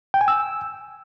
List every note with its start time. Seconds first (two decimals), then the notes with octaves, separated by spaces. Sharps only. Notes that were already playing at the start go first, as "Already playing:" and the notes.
0.14 G5
0.21 G#5
0.28 E6